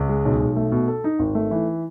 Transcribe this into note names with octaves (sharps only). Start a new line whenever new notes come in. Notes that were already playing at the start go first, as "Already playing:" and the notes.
Already playing: C#2
G#3
B1
B1
A3
B2
A4
D#4
G#1
A3
E3